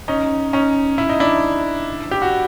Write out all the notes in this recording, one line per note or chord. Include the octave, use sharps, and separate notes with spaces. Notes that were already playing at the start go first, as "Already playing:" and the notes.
C#4 D#4
C#4 D#4
E4
D#4
D4 E4
G4
F#4